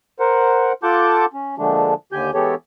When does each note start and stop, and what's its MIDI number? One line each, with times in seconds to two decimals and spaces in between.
0.19 0.72 70
0.19 0.72 72
0.19 0.72 78
0.83 1.25 65
0.83 1.25 69
0.83 1.25 78
0.83 1.25 81
0.83 1.25 86
0.83 1.25 91
1.34 1.55 61
1.58 1.94 46
1.58 1.94 50
1.58 1.94 53
1.58 1.94 56
1.58 1.94 57
1.58 1.94 62
2.12 2.31 39
2.12 2.31 50
2.12 2.31 67
2.12 2.31 80
2.12 2.31 91
2.34 2.55 52
2.34 2.55 56
2.34 2.55 59
2.34 2.55 67
2.34 2.55 69
2.34 2.55 73